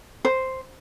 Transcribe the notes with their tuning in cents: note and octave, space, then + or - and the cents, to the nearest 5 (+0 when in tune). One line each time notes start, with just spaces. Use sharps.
C5 +0